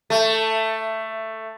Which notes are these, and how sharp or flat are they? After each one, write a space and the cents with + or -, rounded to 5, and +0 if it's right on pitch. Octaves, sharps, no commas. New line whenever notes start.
A3 +10